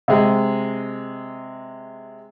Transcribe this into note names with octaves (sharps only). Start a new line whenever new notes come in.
C3 G#3